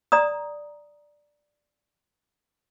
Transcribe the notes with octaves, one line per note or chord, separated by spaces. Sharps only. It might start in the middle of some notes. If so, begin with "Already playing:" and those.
D5 A#5 D#6